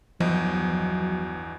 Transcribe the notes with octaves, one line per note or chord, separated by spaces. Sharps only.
G1 E2 F3 F#3 D#5